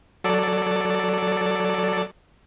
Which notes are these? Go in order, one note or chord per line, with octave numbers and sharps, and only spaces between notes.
F#3 A4 D5